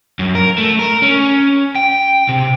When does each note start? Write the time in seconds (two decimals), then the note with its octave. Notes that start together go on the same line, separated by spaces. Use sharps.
0.19 F#2
0.35 A#4
0.58 A3
0.79 A#4
1.02 C#4
1.75 G5
2.29 C3